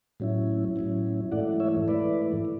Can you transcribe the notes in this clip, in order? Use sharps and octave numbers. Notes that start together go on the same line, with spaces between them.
A2 F#3 C#4 E4
A2 F#3 C#4 E4
G#2 E3 A3 E4 D5 F#5
C#5 E5
G#2 E3 A3 E4 B4 D5
E3